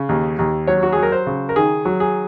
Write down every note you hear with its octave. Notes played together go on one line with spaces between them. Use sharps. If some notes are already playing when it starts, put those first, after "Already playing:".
Already playing: C#3
D#2
D#2
F#3 C#5
F#4
F#3 G#4
A#4
C5
C#3
A#4
D#3 G#4
F#3
G#4